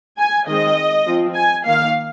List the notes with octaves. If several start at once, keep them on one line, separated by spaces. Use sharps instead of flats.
G#5
D#3 G#3 C4 D#5
F3 C4
G#5
D#3 A#3 F5